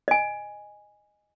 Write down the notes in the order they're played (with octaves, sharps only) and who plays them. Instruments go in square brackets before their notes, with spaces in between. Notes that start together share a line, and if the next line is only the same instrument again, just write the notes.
[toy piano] D#5 G#5